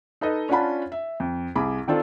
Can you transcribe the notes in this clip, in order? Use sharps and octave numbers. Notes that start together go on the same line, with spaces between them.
D#4 A4 B4 D#5
C#4 D4 F4 F#5 A5 B5
E5
F2
C2 G#4 B5 D6
D#3 C4 D4 F4 A4